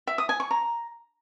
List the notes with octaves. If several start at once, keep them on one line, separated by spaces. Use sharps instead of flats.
E5
D#6
G#5
C#6
A#5